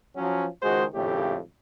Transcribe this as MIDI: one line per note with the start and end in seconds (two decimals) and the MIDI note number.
0.17 0.46 53
0.17 0.46 54
0.17 0.46 61
0.63 0.84 37
0.63 0.84 51
0.63 0.84 56
0.63 0.84 66
0.63 0.84 68
0.63 0.84 72
0.94 1.37 32
0.94 1.37 41
0.94 1.37 45
0.94 1.37 49
0.94 1.37 57
0.94 1.37 67